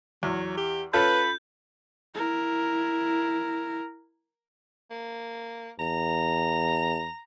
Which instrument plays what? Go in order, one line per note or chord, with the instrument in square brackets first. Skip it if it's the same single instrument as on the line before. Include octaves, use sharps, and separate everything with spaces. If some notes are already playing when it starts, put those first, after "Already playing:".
[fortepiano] E2 [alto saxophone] F#3
[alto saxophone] G4
[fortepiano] C#4 F4 A4 [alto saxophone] B4 [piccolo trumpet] B5 [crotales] G6
[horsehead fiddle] E4 A#4
[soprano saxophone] A#3
[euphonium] E2 [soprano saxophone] A#5